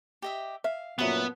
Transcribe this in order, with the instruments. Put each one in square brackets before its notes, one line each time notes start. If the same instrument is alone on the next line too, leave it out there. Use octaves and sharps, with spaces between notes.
[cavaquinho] G4 D#5 E5
[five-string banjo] E5 [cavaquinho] F5
[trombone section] F#2 A#2 F#3 [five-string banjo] F3 [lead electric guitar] B3 [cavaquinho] B4 E5 B5